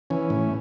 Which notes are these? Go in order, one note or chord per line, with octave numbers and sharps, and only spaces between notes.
E3 C#4
A2